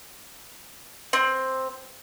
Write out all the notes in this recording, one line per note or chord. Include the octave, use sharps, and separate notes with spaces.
C4